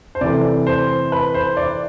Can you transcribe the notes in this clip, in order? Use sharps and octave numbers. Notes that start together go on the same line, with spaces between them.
C5
C3 E3 A3 D5
C5
B4
C5
D5